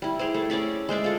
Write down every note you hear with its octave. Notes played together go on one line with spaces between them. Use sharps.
G3 E4
G4 G#4 C5
A3 A4
C#4 G#4 D5 E5
G#3 C5 D5 E5
F4 A4